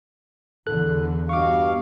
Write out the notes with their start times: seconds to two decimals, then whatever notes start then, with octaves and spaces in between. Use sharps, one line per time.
0.67 E2 D3 A4 F#6
1.29 G2 B2 F5 C#6 D6